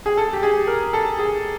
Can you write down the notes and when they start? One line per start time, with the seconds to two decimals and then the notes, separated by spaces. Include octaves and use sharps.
0.06 G#4
0.17 A4
0.33 G4
0.43 G#4
0.67 A#4
0.93 A4
1.19 G#4